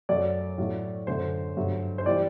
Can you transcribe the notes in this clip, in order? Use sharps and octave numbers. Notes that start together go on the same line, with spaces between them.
F#2 F#3 A3 D5
A2 F#3 A3
F#2 D3 A3 C5
G2 F#3 A3
C5
E3 G3 D5